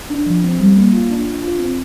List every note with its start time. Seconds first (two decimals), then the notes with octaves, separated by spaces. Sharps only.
0.10 D4
0.26 F3
0.43 C4
0.60 G3
0.75 A#3
0.93 F4
1.10 D4
1.27 D4
1.43 F4
1.59 C4